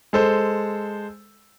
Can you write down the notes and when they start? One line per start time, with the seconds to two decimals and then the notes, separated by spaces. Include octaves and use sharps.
0.13 G#3 A4 C5